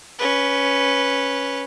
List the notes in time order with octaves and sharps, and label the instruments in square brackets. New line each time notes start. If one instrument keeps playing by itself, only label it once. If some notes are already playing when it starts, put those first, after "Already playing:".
[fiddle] C#4 B4